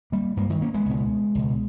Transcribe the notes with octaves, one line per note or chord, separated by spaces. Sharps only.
G3 A#3
G2 G3 A#3
D#3 G3
A#3 C#4
G#3 B3
C#2 B2
C#2 B2